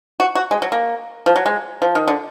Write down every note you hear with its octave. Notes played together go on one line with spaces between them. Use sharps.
F#4
F#4
G#3
F#3
A#3
F3
F#3
G#3
F3
D#3
D3